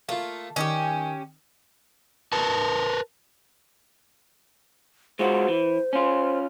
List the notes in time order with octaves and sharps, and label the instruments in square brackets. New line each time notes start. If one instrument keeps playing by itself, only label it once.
[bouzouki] A3 [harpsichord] A#3 F4
[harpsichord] D#3 [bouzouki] C#4 D#4 G4
[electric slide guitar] A#4 B4 A5
[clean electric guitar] G#3 F4 F#4 [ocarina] C5
[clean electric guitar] E3
C#4 F4